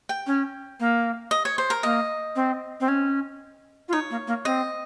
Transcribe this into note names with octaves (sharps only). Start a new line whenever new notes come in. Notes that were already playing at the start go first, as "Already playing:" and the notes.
G5
C#4
A#3
D#5
C#5
C5
A#4
A#3 D#5
C4
C4
C#4
F4
D#4 C#5
A#3
A#3
C4 D#5